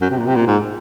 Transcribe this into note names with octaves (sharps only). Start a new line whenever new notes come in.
F#2
C3
A#2
C3
A#2
G#2